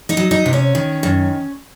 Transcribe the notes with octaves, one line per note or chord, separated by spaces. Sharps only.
D#4 D#5
F#3
D#4 D#5
C3
C#4 C#5
D#3
F#2